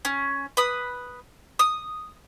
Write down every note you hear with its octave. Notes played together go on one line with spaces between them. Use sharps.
C#4
B4 D#6
D#6